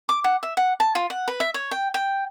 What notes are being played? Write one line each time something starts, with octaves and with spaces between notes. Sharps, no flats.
D6
F#5
E5
F#5
A5
F4
F#5
B4
E5
C#5
G5
G5